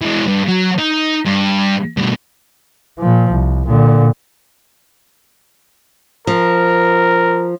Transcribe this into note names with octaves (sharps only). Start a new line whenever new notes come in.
E3 G#3
G2
F#3
D#4
G2
G2 B2
A#2 F3
C2
A#2 D3
F3 A#4